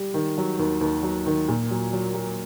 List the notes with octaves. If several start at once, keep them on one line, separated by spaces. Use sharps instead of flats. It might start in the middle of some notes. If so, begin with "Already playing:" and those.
Already playing: G3
D#3
F#3
D#2
D#2
F#3
D#3
A#2
F#3
F#3
F#3